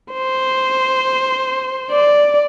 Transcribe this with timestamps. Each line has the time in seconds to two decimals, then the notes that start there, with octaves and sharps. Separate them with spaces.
0.13 C5
1.91 D5